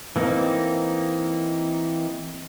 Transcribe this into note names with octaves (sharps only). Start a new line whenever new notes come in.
E3 A#3 C4 D#4